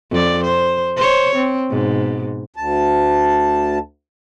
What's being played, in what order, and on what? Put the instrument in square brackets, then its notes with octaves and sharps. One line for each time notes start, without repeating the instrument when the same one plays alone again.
[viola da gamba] F2 D5
C5
C5 C#5
C4
G#2 B2
[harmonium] D2 A5